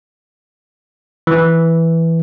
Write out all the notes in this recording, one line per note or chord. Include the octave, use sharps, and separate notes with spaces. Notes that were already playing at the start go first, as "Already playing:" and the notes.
E3